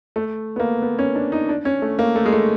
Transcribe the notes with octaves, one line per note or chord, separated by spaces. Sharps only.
A3
B3
A#3
B3
C#4
D4
D#4
D4
C#4
A3
A#3
A3
G#3
A3